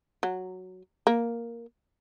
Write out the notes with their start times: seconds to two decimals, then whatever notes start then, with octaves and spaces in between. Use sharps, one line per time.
0.23 F#3
1.07 A#3